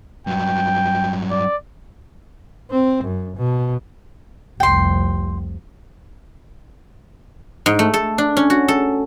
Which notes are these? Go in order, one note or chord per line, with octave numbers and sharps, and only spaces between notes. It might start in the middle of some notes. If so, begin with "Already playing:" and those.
G2 F#3 G5
D5
C4
F#2
B2
F1 C2 G5 C6
G#2
A3
A4
D4
C#4
F#4
A4